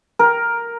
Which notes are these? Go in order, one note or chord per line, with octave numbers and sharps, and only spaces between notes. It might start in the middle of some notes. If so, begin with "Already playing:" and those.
A#4